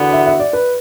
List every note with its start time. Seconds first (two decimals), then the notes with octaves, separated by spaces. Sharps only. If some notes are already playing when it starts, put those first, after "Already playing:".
Already playing: E2 D3 B3 F#4
0.13 E5
0.27 E5
0.39 D5
0.53 B4